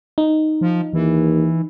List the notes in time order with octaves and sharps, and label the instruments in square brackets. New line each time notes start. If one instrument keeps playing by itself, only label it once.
[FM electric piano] D#4
[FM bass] F3
[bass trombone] D#2 [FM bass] E3